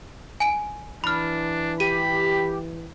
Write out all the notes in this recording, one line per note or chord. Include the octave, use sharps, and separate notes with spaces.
G#5 D7
E3 D4 B5 F6
G4 B5 D#7